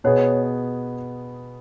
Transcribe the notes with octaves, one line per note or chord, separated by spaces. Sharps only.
B2 B3 G#4 C#5